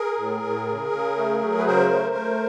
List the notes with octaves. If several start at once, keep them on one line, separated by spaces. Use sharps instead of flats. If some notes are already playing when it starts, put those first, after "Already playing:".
Already playing: G#4 A#4
A2
A2
C#3
C#3
A3
F#3
B4
C#3 A#4 C5
A3
A3